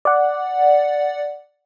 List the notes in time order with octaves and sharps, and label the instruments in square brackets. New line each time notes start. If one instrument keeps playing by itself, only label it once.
[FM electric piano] D5 F#5